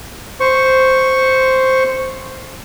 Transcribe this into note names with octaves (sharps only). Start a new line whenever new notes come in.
C5 C#6